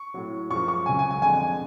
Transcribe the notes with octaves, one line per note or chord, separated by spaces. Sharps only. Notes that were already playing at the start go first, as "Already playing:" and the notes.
Already playing: C#6
A2 F#3
F#2 F3 G#3 C#6
C#6
C#2 C#3 F#3 G#5
G#5
G#5
F2 D3 G#3 G#5